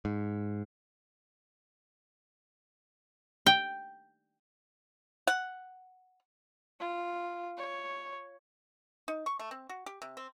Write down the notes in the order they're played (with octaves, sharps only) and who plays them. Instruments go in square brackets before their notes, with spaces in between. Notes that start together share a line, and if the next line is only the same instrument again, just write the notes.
[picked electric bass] G#2
[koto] G5
[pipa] F#5
[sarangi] F4
C#5
[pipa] D#4
C#6
A3
C4
F#4
G4
C3
C4